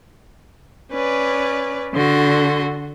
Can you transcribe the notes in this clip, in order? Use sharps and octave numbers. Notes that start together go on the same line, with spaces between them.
C#4 B4 D5
D3 F#4 C6